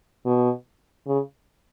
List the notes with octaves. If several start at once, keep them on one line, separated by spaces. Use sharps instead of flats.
B2
C#3